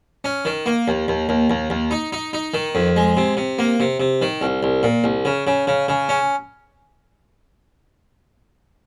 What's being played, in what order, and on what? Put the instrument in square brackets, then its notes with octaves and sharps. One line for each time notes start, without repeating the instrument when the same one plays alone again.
[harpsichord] C#4
D#3
A#3
D#2
D#2
D#2
D#2
D#2
D#4
D#4
D#4
D#3
F2
G#3
C3
C3
A#3
C3
C3
D#3
C2
C2
A#2
C2
C#3
C#3
C#3
C#3
C#4